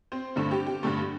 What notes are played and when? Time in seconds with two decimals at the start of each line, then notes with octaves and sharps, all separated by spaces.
0.12 C4 C5
0.36 G2 D3 A3
0.51 G4
0.67 G4
0.83 G2 D3 A3